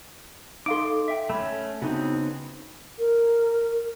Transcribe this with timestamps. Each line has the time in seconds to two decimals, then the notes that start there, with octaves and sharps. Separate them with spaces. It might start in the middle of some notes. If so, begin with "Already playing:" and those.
0.66 D#4 A4 F5 C6 D6 D7
1.08 E5 G5
1.30 A3 C#4 B5
1.82 C#3 B3 C4 D4 D#4 F#4
2.99 A#4